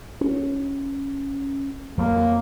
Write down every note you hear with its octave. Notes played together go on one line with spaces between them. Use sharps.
C#4
F2 F3 F#3 A#3